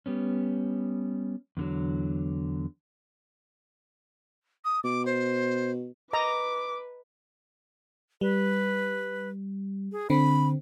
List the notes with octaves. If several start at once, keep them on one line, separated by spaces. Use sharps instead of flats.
G3 B3 C#4
E2 D3 F#3
D#6
B2 D6
C5
B4 D#5 A#5 D6
G3 B4
G#4
D3 C4 B5